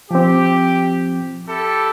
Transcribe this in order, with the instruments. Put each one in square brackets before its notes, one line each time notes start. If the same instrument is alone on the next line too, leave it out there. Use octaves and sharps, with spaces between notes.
[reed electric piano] F3 C4 [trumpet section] G4
[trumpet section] E4 G4 A4